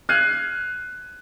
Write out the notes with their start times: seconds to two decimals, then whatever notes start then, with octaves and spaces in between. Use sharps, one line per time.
0.09 F6 F#6 G#6 C7 D#7